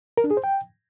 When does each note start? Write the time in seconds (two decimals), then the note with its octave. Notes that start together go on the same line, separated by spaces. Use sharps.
0.17 A#4
0.24 D4
0.31 G#4
0.37 C5
0.44 G5